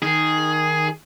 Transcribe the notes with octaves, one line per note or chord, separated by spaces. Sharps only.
D#3 G#4